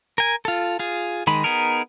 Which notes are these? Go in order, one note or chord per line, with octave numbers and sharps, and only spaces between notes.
A#4 G#5
F4 A4
F4 G#4
D#3 G#3 B5
B3 D#4 G#4 A#4